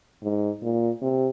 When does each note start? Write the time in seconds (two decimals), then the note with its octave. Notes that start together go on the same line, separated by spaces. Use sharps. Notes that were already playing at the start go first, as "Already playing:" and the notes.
0.23 G#2
0.63 A#2
1.02 C3